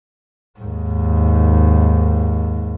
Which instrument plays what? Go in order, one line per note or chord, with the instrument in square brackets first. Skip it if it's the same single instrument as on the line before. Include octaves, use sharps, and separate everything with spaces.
[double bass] D#2 G#2